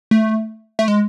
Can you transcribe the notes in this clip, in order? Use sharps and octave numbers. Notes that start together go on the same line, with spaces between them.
A3
A3
G#3